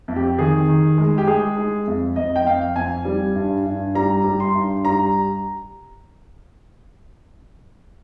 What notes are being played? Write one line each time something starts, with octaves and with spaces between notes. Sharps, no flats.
F2
G4
D#3 G#4
D#3
G#3
G4
G#3 G#4
G#3
F2
F2 D#5
G5
F2 F5
F2 G#5
G3
G2
G2
G3 A#5
G3
C6
G2
G3 A#5